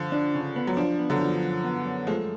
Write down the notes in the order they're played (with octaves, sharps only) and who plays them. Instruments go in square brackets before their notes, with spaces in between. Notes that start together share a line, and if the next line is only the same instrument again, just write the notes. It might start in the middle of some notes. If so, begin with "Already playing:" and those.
Already playing: [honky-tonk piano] D3 F3
[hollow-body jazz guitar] D4
C#3
B3
[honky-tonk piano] F#3
[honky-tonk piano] F3 [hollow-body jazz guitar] D4
[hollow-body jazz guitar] B3
[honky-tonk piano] D3 F#3
[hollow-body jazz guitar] F3
F#2
B3
F#2
[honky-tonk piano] F3 G#3 [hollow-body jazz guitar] A3